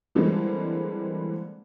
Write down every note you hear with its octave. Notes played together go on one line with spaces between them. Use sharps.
D3 E3 G3 G#3 A#3 C4